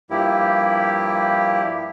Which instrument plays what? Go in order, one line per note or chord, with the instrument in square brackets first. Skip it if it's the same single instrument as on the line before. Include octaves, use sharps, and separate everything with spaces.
[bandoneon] G2 F3 A#3 E4 G4